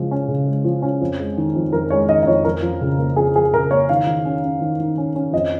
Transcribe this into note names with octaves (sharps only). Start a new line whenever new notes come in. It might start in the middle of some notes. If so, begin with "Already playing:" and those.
Already playing: C#3 F3 G#3
C#4
C#3
G#3
F3
C#4
F2
G#3
D#3
F2
F2 A#4
G#3 C#5
D#3 D#5
D#5
F2 C#5
F2 A#4
F3
C#3
A#3
F2 G#4
F3 G#4
C#3 A#4
A#3 C#5
D#3 F5
D#3
C#4
C#4
D#3
D#3
C#4
C#4
F2 D#5